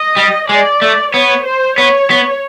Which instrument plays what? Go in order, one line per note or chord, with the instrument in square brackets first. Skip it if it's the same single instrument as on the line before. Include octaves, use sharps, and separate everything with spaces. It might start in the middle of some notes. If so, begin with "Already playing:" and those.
Already playing: [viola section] D#5
[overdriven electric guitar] G3
[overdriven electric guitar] G#3 [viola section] D5
[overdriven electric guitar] A3
[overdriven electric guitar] B3 [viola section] C#5
[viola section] C5
[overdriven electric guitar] B3 [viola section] C#5
[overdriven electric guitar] B3